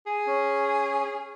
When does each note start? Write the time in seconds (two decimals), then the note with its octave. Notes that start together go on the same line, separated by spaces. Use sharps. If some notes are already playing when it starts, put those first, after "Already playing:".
0.07 G#4
0.27 C#4